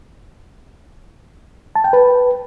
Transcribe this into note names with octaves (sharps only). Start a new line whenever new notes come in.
A5
G5
B4